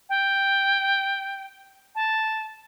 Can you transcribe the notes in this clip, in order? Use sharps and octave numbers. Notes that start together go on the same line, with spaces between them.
G5
A5